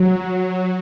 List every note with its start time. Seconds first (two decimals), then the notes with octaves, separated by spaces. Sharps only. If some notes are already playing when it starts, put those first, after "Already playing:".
Already playing: F#3